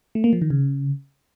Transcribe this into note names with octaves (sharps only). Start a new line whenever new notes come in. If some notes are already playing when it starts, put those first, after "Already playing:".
A3
A#3
F3
D#3
C#3